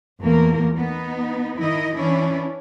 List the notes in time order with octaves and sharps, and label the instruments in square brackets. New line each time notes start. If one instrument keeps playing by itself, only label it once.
[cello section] E2 A#2 A3 A#3 A#4
B3 D#4
D#3 D#4 E4 D#5
E3 C#4 D4 E4